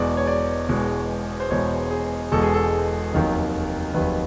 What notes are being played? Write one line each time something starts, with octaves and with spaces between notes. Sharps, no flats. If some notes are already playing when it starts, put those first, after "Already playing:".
Already playing: E1 E2 B2 G#3 D5
C#5
D5
E1 E2 B2 G#3
C5
E1 E2 B2 G#3 C#5
G#4
E1 E2 B2 G#3 A4
G#4
A4
F1 D#2 D#3 F#3
F1 D#2 D#3 F#3 B4